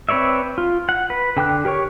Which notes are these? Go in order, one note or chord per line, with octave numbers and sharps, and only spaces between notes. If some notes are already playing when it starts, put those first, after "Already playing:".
C4 B4 C#5 D5 E5
F4
F#5
B4
D3 G5 D6 F#6
G4 A#4 C#5 C#6